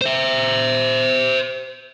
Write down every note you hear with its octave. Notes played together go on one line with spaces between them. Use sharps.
C5 E5